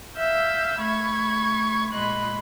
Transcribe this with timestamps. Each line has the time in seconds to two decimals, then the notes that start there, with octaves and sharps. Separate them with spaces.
0.17 E5 F5 E6 G6
0.81 A3 B5 C#6 G#6
1.93 A#2 G#3 D#5 B5 C6 F#6